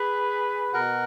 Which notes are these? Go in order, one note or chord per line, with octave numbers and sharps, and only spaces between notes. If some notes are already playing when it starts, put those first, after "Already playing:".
Already playing: G#4 B4
B2 F#4 A#4